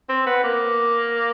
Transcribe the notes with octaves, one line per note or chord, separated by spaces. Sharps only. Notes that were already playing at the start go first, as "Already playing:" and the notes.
C4
B3
A#3